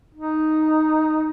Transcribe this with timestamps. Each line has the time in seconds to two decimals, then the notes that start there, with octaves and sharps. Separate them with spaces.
0.15 D#4